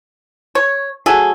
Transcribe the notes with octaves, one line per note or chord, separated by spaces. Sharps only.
C#5
F#3 A3 G#4 A4